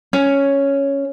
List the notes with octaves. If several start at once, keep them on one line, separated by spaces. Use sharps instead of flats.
C#4